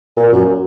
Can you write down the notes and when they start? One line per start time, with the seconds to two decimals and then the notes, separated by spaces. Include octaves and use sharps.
0.17 A#2
0.32 F#2